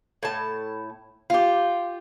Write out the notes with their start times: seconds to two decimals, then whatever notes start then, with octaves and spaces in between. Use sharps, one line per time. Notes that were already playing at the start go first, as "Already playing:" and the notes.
0.23 A2 A5
1.30 F4 G4